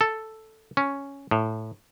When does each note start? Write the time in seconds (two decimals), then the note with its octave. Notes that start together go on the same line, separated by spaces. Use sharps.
0.01 A4
0.77 C#4
1.31 A2